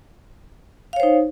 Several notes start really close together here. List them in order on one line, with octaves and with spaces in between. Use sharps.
F5 C#5 C5 D#4